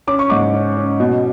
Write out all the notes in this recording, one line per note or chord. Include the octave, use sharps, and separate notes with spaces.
C#4 D6
C#6
G#2 D6
C#4
C#4
B2